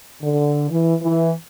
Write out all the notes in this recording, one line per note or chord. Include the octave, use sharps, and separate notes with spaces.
D3
E3
E3